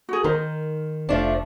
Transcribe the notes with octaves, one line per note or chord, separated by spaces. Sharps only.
F#4 G#4
D#3 A#4 C5
F1 F3 A3 D4